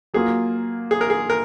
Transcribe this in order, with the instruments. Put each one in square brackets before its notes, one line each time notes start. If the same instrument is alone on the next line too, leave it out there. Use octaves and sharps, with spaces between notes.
[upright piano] F#3 A#3 F4 [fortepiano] G#4
[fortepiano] G#4
A#4
G#4
A#4